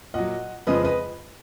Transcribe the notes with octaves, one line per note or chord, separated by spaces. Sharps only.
A#2 F#3 D#5 F#5
F2 C#3 F3 G#3 B4 D#5
B4 D#5